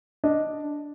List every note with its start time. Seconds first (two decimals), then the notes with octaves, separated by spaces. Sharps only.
0.24 D4 D#5